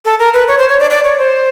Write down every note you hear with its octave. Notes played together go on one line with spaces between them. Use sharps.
A4
A#4
B4
C#5
C5
C#5
D5
D5
C#5
C5